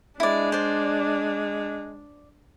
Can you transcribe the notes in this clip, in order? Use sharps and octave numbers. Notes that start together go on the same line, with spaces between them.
G#3 D4 E4 D5
C5 D5